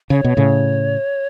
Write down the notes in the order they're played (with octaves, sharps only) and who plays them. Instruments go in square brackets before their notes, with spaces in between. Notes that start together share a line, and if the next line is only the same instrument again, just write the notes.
[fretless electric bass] C#3 [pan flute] C#5
[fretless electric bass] B2
A2 C#3